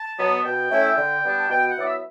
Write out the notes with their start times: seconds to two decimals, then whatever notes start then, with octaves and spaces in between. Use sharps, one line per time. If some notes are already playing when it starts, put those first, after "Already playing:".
Already playing: A5
0.18 B2 F#3 B3
0.44 B2 G5
0.71 A3 C#4 E4
0.97 D3
1.24 G3 B3 D4
1.39 A5
1.50 B2 G5
1.69 F#5
1.77 F#3 B3 E4 D5
1.86 E5